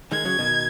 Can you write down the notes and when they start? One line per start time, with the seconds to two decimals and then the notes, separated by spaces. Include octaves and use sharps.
0.12 D#3 G#3 G#6
0.25 C#3 F#3
0.39 B2 D#3